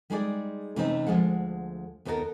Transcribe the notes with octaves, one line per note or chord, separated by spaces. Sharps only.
G3 G#3 D#4 G#4 A#4 D5
C3 E3 A3 C4 C#4 D#4
D2 G2 F3 G#3 F#5
D#2 B3 C#4 E4 A4 A#4